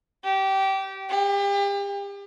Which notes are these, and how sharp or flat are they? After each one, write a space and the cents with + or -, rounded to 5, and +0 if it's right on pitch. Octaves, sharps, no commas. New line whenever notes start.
G4 -20
G4 +35